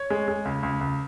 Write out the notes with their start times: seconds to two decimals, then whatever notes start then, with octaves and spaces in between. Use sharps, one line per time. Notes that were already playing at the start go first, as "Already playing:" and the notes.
Already playing: C#5
0.10 G#3
0.28 G#3
0.45 C#2
0.63 C#2
0.81 C#2